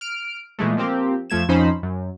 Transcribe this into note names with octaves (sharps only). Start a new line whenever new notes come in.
F6 D7
A#2 E3 G#3 A3
F3 A#3 C4 G4
F2 F3 A3 G#6 E7
F2 F3 C#4 D#4 C5 B5
F#2